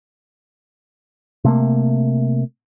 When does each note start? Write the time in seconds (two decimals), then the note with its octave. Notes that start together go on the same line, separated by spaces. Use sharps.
1.45 C3 A3 A#3